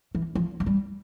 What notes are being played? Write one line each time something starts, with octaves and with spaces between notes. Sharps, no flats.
E3
F3
G#3
G3